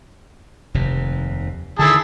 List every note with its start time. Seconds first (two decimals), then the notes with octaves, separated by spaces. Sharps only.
0.74 F1 D#2 C3
1.79 D3 D#3 E4 G#4 A5